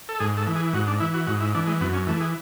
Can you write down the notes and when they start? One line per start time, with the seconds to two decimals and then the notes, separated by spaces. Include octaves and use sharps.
0.09 A4
0.20 G#2 G#4
0.37 A4
0.47 E3
0.56 G#4
0.73 G#2 F#4
0.88 D4
1.00 E3 E4
1.14 F#4
1.27 G#2 F#4
1.40 E4
1.55 E3 D4
1.67 G#3
1.80 F#2 B3
1.93 C#4
2.07 E3 A3
2.21 G#4